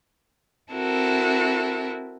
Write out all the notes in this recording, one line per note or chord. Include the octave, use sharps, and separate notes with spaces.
C4 E4 F#4 A4 A#4